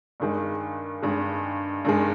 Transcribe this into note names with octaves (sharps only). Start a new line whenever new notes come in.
G2 D#3 G#3
G2 D#3 G#3
G2 D#3 G#3